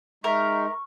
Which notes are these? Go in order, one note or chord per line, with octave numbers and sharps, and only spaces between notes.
G#3 D#4 A#4 E5 C#6